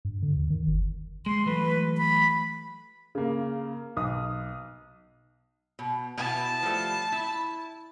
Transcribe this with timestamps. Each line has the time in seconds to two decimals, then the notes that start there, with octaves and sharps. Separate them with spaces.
0.05 G2
0.22 D3
0.37 D#2
0.50 D#3
0.67 G1
1.26 G#3 C6
1.46 E3 F#3 A3 B4
1.98 B5
3.15 C#3 A#3
3.97 B1 D#6
5.79 B2
6.18 B2 B3 E4 A5
6.63 F3 G3 A3
7.12 E4